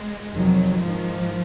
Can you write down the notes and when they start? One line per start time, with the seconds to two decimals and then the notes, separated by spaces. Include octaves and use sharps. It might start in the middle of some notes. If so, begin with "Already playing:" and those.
Already playing: G#3
0.34 F2 C3 D#3 F#3
0.82 G#2 D#3 F3